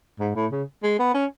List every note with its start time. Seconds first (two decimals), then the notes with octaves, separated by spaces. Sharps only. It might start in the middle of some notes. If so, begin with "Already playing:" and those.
0.20 G#2
0.35 A2
0.52 C#3
0.83 G#3
0.99 B3
1.14 C#4